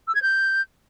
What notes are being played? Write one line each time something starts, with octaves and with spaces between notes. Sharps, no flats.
E6
G#6
G6